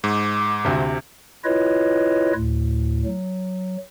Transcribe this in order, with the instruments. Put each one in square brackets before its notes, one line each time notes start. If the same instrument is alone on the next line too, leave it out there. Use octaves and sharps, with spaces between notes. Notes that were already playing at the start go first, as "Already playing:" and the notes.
[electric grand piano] G#2 [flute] D6
[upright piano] D2 C3
[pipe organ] E4 F4 B4 C#5 D#5
D2 A2
F#3